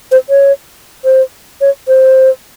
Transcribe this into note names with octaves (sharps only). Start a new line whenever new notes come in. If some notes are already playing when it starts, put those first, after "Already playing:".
C5
C#5
C5
C#5
C5